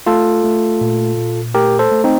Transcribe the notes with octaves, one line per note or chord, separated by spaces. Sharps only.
A3 F4 A4
A3
A#2
A#2
A3 G4 A#4
A4 C5
A3
C4 D#4